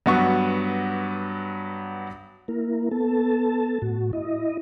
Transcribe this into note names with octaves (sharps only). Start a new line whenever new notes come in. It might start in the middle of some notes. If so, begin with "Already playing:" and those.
G2 F#3 B3 F#4 C#6
A#3 E4 A#4
B3 A4 A5
A2 F#4
E4 D#5